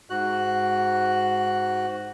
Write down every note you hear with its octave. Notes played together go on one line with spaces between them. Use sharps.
G#2 F#4 F#6